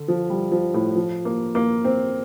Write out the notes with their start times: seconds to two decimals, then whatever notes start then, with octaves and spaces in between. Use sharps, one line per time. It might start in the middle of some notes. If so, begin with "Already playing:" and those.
Already playing: D3
0.08 F3
0.30 G3
0.52 F3
0.74 A2
0.96 F3
1.25 A#3
1.55 A#3
1.85 C4